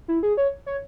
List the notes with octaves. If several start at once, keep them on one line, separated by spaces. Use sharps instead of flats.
E4
G#4
C#5
C#5